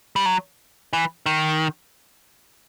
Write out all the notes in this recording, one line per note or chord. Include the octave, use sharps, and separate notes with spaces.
G3
F#3
E3
D#3